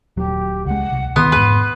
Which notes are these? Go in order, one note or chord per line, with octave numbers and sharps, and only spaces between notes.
D#1 F#3 G4
C#2 G#3 F#5
C2
C2 D#3 E3 B3 C6
E2 G#2 B4